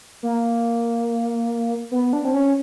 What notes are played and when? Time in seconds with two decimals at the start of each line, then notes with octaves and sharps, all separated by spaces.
0.23 A#3
1.91 B3
2.13 D4
2.25 C4
2.34 C#4